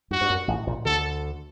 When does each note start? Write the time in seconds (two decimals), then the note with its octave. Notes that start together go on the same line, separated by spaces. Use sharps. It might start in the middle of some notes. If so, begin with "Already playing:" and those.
0.11 G2 F#4
0.21 G2
0.30 F#2
0.48 A1 A2
0.67 A#1 A#2
0.85 D2 D3 A4